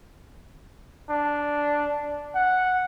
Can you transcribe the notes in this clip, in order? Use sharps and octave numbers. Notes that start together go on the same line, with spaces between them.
D4
F#5